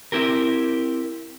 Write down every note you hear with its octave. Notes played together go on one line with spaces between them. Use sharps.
C4 E4 G4 A#4